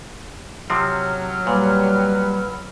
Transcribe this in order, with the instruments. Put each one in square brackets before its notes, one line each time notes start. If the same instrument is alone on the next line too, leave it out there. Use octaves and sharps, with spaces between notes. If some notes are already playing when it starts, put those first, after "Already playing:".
[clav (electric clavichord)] C3 F3 C4 [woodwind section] F#3 F6
[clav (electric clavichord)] A#2 [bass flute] G3 [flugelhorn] B4